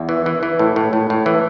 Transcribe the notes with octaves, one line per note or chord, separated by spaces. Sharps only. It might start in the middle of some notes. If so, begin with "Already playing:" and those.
Already playing: E2
E3
E3
E3
A2
A2
A2
A2
E3